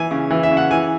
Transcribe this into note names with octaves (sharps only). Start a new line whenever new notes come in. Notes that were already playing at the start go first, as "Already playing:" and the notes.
Already playing: E3 G#5
C#3
E3
E5
C#3
F#5
E3 G#5